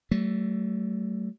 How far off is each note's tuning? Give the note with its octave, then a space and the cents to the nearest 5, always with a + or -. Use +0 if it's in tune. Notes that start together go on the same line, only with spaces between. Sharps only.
F#3 +45 A3 +0